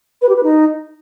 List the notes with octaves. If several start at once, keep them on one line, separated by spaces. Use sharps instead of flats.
B4
G4
B4
D#4